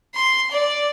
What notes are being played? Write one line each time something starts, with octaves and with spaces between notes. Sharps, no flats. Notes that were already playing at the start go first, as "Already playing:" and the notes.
C6
D5